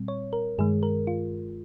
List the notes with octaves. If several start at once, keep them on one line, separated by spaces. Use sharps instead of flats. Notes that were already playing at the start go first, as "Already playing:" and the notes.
Already playing: A#2 G3 C4
C#5
A#4
G2 D#3 G#3 G#4
A#4
F4